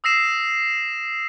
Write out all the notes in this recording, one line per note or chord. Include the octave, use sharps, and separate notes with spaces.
D#6 E6 A#6 C7 E7